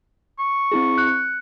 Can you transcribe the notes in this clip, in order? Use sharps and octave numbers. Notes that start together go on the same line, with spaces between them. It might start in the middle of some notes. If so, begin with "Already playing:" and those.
C#6
C4 E4 G#4
F#6 C#7